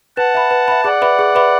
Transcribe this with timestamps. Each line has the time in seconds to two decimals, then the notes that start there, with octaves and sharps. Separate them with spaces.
0.17 B4 F#5 A5
0.34 E5 B5
0.51 B4
0.68 E5 B5
0.84 G#4 D5 F#5
1.02 B4 E5 B5 D6
1.19 G#4
1.35 B4 E5 B5 D6